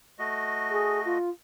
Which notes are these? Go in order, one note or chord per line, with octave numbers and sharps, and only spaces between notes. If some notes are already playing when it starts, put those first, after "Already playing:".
A3 F#4 D#5
G#4
F4